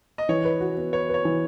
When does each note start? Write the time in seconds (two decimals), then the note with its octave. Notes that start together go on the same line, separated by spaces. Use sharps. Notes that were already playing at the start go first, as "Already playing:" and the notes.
0.18 D#5
0.29 E3 C#5
0.45 B4
0.61 F#4
0.77 B3
0.93 B4 C#5
1.09 B4 C#5
1.25 E3